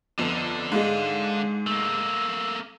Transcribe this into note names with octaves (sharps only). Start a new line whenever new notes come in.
G1 F2 D3
G#2 G#3 F5
A3 A#3 E6